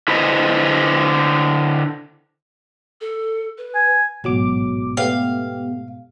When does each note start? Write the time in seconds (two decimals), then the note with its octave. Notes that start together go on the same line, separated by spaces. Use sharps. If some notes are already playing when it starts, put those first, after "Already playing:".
0.08 D3 E4 B4 C5 D#5
3.01 A4
3.58 B4
3.75 G#5
4.24 A1 G#2 B2 F#3 D6
4.97 A3 B3 G4 F5